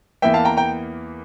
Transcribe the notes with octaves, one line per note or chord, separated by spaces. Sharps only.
E2 E3 A#3 E5 G5
F5 A5
G5 A#5
G5 A#5